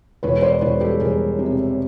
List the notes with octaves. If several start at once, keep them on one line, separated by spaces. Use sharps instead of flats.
E1 B4 C#5
C5 D5
E1 B4 C#5
G4 A4
E1 G#4 A#4
C3